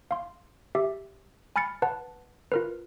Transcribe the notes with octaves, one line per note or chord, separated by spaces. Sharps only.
F5 C6
G4 E5
G#5 B5 F6 A6 C#7
B4 F#5 A5
F4 A#4 B4